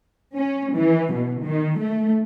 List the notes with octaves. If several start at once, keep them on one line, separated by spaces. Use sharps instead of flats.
C#4
E3
B2
D#3
A3